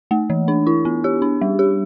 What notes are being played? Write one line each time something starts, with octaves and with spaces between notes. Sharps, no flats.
A3
E3
D4
E4
B3
G4
D4
G3
G4